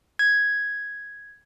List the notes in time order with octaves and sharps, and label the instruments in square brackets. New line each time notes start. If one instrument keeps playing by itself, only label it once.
[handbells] G#6